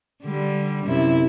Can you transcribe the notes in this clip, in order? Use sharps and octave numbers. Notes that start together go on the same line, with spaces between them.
D3 G3
F#2 C3 E4